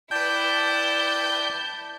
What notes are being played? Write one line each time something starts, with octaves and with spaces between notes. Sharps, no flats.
E4 B4 D5 G5 A5 G6